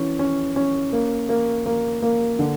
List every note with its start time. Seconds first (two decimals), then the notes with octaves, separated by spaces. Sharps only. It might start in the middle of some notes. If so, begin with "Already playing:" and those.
Already playing: E3 C#4
0.19 C#4
0.56 C#4
0.93 A#3
1.29 A#3
1.66 A#3
2.02 A#3
2.39 D3